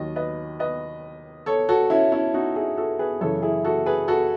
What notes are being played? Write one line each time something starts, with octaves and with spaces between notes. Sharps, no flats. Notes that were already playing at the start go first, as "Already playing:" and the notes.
Already playing: D#2 D#3 F#3 D#5
B4 D#5
B4 D#5
A4 C#5
F#4 A4
C#4 E4
C#4 E4
D#4 F#4
E4 G#4
F#4 A4
G#4 B4
F#2 C#3 E3 A4 C#5
E4 G#4
F#4 A4
G#4 B4
F#4 A4